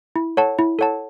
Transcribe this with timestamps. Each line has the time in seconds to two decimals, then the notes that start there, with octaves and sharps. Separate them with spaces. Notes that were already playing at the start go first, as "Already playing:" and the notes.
0.16 E4
0.37 A4 C#5 F#5 A5
0.59 E4
0.79 A4 C#5 F#5 A5